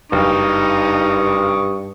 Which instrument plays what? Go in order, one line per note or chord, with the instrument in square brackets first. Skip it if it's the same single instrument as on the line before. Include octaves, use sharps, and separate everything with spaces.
[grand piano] F#1 [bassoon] G2 [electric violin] D#4 [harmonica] C#6 D#6